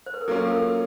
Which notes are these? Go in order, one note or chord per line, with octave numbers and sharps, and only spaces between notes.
C5
B4
A#4
F#3 A#3 C#4 F4 A4
A4
A#4